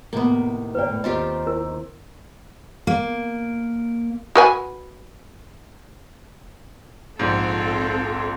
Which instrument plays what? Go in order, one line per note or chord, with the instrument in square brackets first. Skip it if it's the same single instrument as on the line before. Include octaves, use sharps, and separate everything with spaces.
[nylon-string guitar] A2 C3 D#3 [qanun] A#3 B3
[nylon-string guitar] G2 D#3 G5 [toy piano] B4 D5
[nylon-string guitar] A2
[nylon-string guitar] D#2 D#3 [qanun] C4 F4 G4 [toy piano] D#5
[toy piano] E4 A#4
[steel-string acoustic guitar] A#3
[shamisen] F#4 B4 G#5
[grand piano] A#1 G#2 [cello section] C4 F4 A4